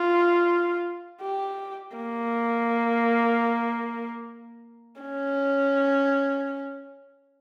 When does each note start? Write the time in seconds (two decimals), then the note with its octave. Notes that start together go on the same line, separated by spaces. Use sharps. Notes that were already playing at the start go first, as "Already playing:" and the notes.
Already playing: F4
1.22 G4
1.96 A#3
5.01 C#4